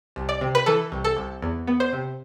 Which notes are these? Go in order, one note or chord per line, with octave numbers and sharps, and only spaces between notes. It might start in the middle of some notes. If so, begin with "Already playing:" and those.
C2
D5
C3
B4
E3 A4
C2
A4
C2
E2
B3
C5
C3